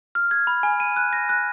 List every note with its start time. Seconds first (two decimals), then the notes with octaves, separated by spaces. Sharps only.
0.15 F6
0.31 G#6
0.47 B5
0.63 G#5
0.80 D#7
0.96 F#6
1.13 A#6
1.29 F#6